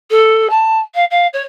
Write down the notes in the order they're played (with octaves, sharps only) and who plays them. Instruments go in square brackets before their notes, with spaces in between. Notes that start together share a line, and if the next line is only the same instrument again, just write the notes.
[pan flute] A4
A5
F5
F5
C#5